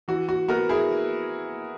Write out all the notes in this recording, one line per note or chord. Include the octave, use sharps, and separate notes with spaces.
E3 F#4
F#4
B3 F#4 A#4
E4 G#4